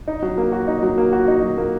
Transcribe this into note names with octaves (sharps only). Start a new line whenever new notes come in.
D#4
F#3
A#3
F#4
D#4
F#3
A#3
F#4
D#4
F#3
A#3